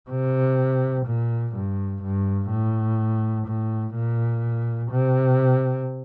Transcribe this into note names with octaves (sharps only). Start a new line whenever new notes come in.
C3
A#2
G2
G2
A2
A2
A#2
C3